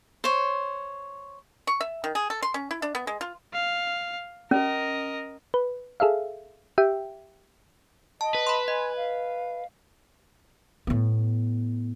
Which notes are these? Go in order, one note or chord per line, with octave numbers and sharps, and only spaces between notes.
C5 C#5
C#6
E5
D#3
G#4
A4
C6
C#4
E4
D4
B3
G#3
F4
F5
C#4 A#4 D#5
B4
G#4 A4 E5 F5
G4 E5 G5
D#5 A5
B4
B5 C6
D#5 G#5
F5
A2 B3